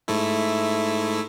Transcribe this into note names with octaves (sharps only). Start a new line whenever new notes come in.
G#2 A3 E4